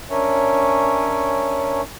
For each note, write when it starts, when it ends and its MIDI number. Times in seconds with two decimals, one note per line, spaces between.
0.10 1.81 61
0.10 1.81 62
0.10 1.81 70
0.10 1.81 73
0.10 1.81 76
0.10 1.81 80